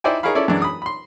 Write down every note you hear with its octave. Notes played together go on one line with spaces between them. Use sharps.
D#4 E4 C5 D5 G5 G#5
D#4 G#4 A#4 C#5 F5 B5
C#4 E4 A4 D5
F#2 E3 G#3 D4
B5 D#6
B5 C6